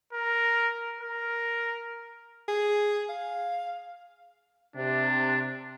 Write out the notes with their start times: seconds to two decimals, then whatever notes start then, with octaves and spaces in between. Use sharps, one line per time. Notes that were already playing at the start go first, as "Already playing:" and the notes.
0.13 A#4
1.01 A#4
2.48 G#4
3.09 F5
4.76 C3 D4